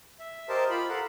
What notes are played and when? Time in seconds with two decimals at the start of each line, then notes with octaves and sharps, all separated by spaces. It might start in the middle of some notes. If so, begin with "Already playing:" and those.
0.19 E5
0.49 G4 A#4 C5 D#5 A5
0.70 F4 B5
0.89 A4 A#4 F5 F#5